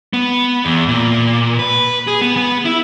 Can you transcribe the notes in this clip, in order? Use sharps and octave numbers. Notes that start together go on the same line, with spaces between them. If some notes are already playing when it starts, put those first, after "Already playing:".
B3
E2
A#2
B4
G#4
B3
B3
E4